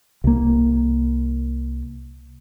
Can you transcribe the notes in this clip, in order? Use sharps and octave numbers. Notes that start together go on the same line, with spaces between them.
C2 A#3